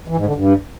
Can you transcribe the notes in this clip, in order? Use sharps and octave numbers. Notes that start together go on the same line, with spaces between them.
E3
G#2
D3
G2